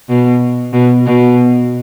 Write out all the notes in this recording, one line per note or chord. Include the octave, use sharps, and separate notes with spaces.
B2
B2
B2